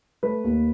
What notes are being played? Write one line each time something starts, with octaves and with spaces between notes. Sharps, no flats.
A3 B4
D#2